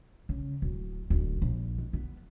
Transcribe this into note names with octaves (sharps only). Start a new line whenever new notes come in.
C#3
D1
D1
A#1
G#3
B3